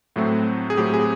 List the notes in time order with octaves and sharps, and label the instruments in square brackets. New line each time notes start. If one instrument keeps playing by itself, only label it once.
[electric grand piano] A2 F#3 A3 C4
G#4
A2 F#3 A3 C4 G4
G#4